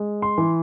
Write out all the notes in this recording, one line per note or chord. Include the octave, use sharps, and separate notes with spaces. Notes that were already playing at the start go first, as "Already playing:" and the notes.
Already playing: G#3
C6
E3